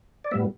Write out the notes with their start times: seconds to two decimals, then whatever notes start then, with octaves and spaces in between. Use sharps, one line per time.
0.24 D5
0.31 A2 G3 B3 E5